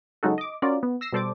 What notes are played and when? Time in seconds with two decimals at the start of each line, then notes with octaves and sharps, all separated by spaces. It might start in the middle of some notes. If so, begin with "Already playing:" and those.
0.23 C#3 F#3 G#3 D#4 F#4 A4
0.38 D#5 D6
0.62 C#4 F4 F#4 A#4 D5
0.83 B3
1.01 E6 A#6 C7 E7
1.13 B2 G3 A4 C5 D5 D6